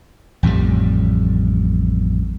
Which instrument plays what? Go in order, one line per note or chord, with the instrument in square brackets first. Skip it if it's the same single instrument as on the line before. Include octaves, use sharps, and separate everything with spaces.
[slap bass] A1 F2 A2 G3